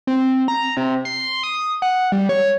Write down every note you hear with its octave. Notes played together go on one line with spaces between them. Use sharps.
C4
A#5
C3
C6
D#6
F#5
G3
C#5